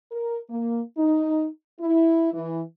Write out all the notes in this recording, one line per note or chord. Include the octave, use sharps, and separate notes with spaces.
A#4
A#3
D#4
E4
E3